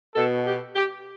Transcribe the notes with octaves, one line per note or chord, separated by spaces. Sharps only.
B2 A4
G4
G4